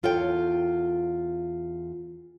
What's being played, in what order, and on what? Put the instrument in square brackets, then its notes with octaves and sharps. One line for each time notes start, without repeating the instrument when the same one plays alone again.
[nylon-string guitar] E2 F4 A4 C#5 G5